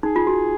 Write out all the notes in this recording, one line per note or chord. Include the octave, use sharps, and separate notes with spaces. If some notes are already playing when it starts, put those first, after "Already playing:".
D#4 G#4
F4
F#4